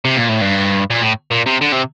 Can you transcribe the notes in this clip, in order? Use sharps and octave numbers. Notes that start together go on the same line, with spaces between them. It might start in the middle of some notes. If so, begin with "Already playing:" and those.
C3
A#2
A2
G2
A#2
A2
A#2
C3
D3
C3